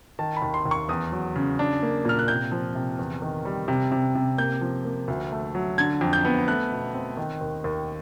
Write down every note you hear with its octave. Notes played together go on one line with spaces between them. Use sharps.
D#3 A5
B5
D#2
C6
D#2
C#6
E2 D#6
F#3
C#3
D4
A#3
A#2 F6
F#6
C3 G6
F3
C3
E2
D#3
G3
C3
C3
C3
A#3 G6
F3
A#3
D2
A3
F#3
D3 G#6
F2
G6
B3
A3 F#6
B2
C4
D#3
D#2
D#2